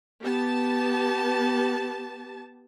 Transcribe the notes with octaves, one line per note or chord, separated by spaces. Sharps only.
B3 G4 A5